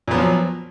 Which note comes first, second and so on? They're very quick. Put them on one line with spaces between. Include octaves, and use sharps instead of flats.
A#2 B3 F#3 F3